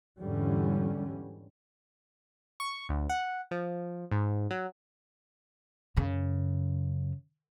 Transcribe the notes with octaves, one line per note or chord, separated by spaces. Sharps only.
E2 G#2 D3 E3 G3 C#4
C#6
D2
F#5
F3
G#2
F#3
F#2 C#3